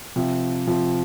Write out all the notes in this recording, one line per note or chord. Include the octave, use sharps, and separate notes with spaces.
C3 F3
C3 F3